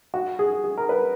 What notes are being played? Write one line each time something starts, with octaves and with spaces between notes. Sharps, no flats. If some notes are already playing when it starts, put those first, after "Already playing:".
F#4
G#4
G#4
A#4
B4